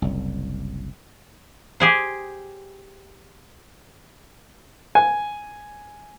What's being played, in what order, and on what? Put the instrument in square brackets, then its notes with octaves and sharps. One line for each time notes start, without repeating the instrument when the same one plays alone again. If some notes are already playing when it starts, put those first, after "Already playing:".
[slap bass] F#1 C2
[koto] G4 G#4 C5
[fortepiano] G#5